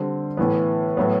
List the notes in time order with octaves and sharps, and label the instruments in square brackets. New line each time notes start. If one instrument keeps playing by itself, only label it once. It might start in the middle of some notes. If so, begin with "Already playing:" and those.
Already playing: [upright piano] D3 G3 C4
A2 E3 B3
A2 F#3 B3